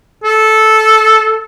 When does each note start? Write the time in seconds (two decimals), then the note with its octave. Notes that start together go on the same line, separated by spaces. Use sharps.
0.24 A4